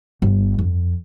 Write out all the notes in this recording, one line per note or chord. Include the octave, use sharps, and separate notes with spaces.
G1
F2